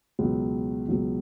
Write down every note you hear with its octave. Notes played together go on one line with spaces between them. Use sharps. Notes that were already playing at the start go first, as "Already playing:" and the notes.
C#2 B2 F#3
C#2 B2 F#3